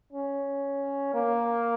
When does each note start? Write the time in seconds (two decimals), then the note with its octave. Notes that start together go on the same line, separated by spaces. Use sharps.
0.13 C#4
1.14 A#3